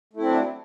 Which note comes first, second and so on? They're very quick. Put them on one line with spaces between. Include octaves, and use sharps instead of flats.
A3 E4 C4 D4 F#3